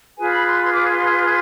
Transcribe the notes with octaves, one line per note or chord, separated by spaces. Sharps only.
F4 G#4 B4 G#5
B5
C6
C6
D6
C6